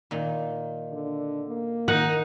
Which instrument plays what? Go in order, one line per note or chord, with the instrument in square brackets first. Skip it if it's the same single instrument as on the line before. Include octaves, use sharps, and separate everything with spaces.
[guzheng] A#2 D#3
[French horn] D3
A#3
[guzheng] D#3 [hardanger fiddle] D#4 [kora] F#5